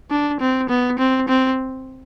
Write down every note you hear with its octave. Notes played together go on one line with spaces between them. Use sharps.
D4
C4
B3
C4
C4